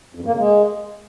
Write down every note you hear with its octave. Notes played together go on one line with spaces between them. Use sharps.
F2
G2
A#3
C#3
G#3